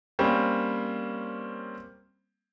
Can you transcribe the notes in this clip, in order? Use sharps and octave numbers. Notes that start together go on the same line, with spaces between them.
G3 A#3 C4 C#4